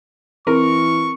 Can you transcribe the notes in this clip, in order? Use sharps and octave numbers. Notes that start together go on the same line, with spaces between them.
E3 C4 A#4 C#6